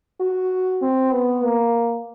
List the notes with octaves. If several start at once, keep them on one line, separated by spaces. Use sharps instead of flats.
F#4
C4
B3
A#3